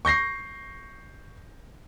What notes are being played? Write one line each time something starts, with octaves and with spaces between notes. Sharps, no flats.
C#6 G6 A#6 C7